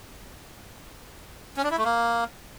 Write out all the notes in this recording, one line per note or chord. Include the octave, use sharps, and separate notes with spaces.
C#4
D4
E4
A3
A#3